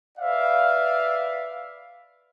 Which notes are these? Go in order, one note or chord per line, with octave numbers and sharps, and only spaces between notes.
B4 D5 E5 F5